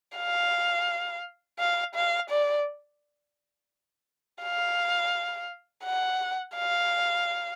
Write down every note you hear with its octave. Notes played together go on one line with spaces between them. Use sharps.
F5
F5
F5
D5
F5
F#5
F5